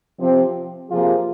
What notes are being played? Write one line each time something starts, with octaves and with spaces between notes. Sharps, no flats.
C3 F3 C4
C3 F3 A#3 F4 G#4